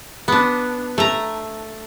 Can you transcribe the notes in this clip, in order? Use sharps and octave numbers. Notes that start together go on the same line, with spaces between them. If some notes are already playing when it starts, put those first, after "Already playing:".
B3 D4
A3 A#5